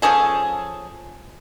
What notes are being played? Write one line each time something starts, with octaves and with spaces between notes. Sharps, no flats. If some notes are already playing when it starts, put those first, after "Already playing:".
F3 C#4 G#4 A4